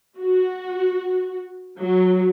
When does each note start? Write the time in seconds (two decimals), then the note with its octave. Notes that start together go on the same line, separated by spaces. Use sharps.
0.20 F#4
1.79 F#3